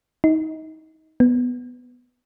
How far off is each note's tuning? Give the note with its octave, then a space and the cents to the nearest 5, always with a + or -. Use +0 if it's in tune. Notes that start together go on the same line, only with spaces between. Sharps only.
D#4 +25
B3 +5